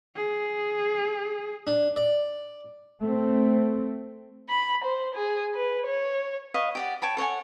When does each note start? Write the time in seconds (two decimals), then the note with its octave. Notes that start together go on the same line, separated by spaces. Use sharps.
0.16 G#4
1.67 D4
1.96 D5
3.00 A3 C4
4.49 B5
4.84 C5
5.15 G#4
5.55 B4
5.86 C#5
6.54 B4 D#5 F5 C#6
6.75 G4 D5 F#5
7.02 C#5 G5 A5 B5
7.17 A4 C#5 F#5 G#5